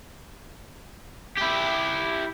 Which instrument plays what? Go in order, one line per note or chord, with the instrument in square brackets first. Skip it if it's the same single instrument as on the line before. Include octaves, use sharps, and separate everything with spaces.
[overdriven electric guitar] E4 G4